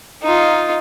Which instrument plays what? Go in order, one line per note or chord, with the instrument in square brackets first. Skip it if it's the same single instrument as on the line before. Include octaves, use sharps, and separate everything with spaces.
[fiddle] D#4 F4